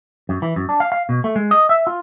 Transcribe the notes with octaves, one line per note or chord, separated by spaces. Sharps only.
F#2
E3
F#2
D4
F5
F5
B2
A3
G#3
D#5
E5
F4